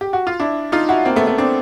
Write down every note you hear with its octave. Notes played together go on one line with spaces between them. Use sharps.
G4
F#4
F4
D4 E4
D#4 F4
E4 F#4
A#3 C4
A3 B3
A3
C4 D4